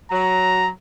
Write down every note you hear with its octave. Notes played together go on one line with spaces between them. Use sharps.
F#3 A#5